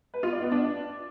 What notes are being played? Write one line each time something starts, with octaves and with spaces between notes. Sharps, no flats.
B4
F4
D5
B3
D4